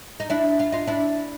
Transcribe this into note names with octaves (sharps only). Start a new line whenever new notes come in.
D#4
D4 E4
F4
D#4 F4
D4 E4